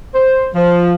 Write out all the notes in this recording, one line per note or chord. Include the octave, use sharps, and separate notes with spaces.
C5
F3